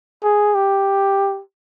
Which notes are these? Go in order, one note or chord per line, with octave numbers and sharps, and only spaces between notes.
G#4
G4